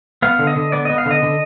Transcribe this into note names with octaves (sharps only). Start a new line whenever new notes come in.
B3 F5
D3
D#5
D3
B3 D5
B3 D#5
F5
D3
D#5
D3